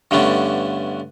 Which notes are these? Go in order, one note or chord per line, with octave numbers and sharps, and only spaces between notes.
G2 D3 A3 B3 C#4